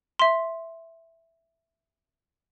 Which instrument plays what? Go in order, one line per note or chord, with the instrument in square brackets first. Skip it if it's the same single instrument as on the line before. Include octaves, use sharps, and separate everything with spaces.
[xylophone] E5 C6